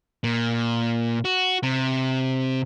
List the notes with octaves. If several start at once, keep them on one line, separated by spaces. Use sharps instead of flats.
A#2
F#4
C3